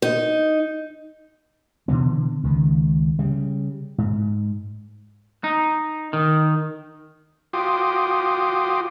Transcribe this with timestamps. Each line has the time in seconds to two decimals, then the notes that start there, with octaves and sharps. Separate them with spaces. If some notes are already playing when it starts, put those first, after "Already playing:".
0.02 D#4
1.88 B2 D3 E3 B3
2.43 C#2 D#3
3.19 C#3 G3
3.98 G#2
5.44 D#4
6.13 D#3
7.53 F4 F#4 G5 C6 D6 D#6